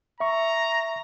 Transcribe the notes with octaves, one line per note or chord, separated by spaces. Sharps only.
E5 A#5 C#6